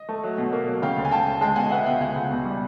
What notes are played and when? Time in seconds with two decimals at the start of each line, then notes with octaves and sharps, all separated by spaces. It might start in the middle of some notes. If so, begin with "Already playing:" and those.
Already playing: D#5
0.09 A3
0.23 F#3
0.38 B2
0.52 A#3
0.68 F#3
0.82 C#3 F5 G5
0.97 D2
1.05 G#5
1.11 D2 G5 A5
1.27 D2
1.41 G#3 G5 A5
1.56 B2 F#5 G#5
1.71 B3 E5 F#5
1.86 B2 F5 G5
2.00 C#2 F#5 G#5
2.16 C#2
2.31 B2
2.45 G3